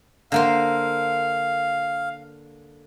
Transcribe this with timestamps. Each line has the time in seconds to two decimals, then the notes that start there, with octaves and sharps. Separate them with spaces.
0.32 D3 A#3 C5 F5